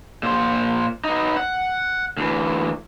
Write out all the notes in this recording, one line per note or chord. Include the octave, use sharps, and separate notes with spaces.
A#2 C5
B3 D#4
F#5
D2 E3